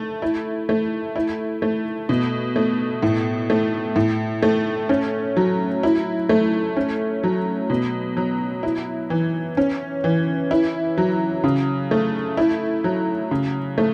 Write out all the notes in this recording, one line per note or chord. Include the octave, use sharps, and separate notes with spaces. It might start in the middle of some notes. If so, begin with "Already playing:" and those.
Already playing: A3
E4
A3
E4
A3
B2
A3
A2
A3
A2
A3
C#4
F#3
E4
A3
C#4
F#3
B2
F#3
E4
E3
C#4
E3
E4
F#3
C#3
A3
E4
F#3
C#3
A3